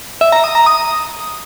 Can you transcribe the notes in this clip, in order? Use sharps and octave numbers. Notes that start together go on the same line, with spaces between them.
E5
A#5
D#6
A#5
D#6